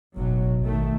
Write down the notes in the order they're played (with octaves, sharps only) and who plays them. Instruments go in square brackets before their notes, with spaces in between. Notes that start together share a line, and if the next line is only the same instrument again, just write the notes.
[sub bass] F#1 [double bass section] B1 A2 F#3
[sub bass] A1 [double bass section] D#3 A3